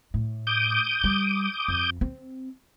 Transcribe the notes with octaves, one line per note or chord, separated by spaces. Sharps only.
A2
D6 D#6 G6
G3
F2
C4